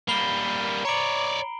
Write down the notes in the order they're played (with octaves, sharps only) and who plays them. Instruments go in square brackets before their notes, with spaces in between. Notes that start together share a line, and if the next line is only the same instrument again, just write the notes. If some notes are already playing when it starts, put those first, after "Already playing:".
[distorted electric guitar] G3 A#3 [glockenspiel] B5 C7 G7
[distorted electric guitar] C#5 D5 [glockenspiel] A#5 D7 F#7